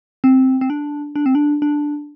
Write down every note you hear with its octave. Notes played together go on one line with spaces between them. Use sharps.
C4
C4
D4
D4
C4
D4
D4